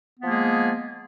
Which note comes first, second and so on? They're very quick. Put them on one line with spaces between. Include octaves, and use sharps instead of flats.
B3 F3 A#3 G#3 G#4